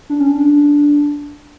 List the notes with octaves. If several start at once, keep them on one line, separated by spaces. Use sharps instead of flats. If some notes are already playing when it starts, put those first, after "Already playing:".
D4
C#4
D4